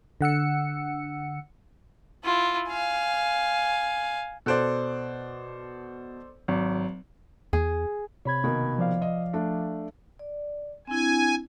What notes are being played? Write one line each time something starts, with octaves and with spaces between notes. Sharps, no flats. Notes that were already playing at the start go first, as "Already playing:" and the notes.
D3 F#5 E6 C#7
E4 F4
F5 G#5
B2 A4 C5 D5 F#6 D7
G#1 F#3
E2 G#4
C3 C#5 B5 G#6
B2 D#3 A#3
F3 D5 F5
D#5
A3 D4
D5
C4 D4 E4 G#5